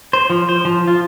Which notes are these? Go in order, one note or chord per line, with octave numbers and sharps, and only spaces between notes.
C5
F3
C5
F3
F4